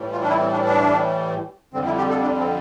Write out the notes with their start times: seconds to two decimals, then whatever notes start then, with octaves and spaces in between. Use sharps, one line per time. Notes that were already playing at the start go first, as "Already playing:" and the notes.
Already playing: A2 E3 G3
0.12 F4
0.23 D4
0.29 E4
0.40 C4
0.52 D4
0.65 D4
1.73 F2 D3 G3 C4
1.85 E4
1.98 G4
2.09 A4
2.22 D4
2.38 C4